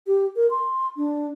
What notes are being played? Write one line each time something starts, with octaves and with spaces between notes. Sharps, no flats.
G4
A#4
C6
D4